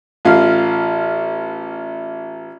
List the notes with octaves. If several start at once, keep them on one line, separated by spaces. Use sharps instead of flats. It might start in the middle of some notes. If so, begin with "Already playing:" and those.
A1 F4 F5